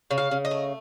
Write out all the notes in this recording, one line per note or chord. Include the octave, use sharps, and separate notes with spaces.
C#3
F5
C#3
D#5
A3